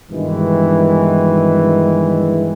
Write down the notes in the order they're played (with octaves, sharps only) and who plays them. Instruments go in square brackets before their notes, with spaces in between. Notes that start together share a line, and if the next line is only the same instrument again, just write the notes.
[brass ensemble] G2 B2 D#3 E3 G#3